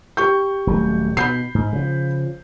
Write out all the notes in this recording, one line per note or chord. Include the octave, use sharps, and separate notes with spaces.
G4 C#6 G6
D#1 F#3 A3
B2 B5 G6 C7
G#2
C#3 F3